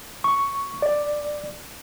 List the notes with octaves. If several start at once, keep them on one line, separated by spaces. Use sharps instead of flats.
C#6
D5